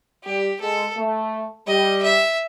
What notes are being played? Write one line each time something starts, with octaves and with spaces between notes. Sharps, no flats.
G3 G4
G#3 A4
A3
G3 D#5
E5